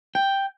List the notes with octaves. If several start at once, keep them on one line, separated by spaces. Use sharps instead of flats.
G5